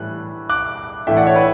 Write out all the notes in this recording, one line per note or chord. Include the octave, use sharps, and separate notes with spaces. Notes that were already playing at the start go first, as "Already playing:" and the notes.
Already playing: A2 E3 G3 F#6
D6 F#6
A2 E3 A3 E5 G5
D5 F#5
C#5 E5
B4 D5